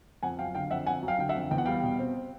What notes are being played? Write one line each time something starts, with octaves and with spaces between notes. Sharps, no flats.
F2 F#5 G#5
F#3 F5 G5
D3 F5 G5
F2 E5 F#5
F2 F#5 G#5
F#3
F5 G5
D3 G5
E5 F#5
F2
E2 G5
F#5
G3 F5 G5
B2
C4